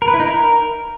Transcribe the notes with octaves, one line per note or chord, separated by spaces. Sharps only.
A#4
B4
E4
D#4
A#4